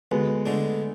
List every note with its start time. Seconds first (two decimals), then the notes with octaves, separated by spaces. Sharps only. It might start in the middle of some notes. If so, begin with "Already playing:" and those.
0.11 D2 G#3 B3
0.46 D3 G#3 A3 D4